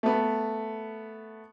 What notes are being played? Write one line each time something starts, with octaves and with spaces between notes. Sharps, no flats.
A3 B3